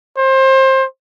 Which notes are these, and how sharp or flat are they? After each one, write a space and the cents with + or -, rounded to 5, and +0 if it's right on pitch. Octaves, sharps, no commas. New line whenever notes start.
C5 +25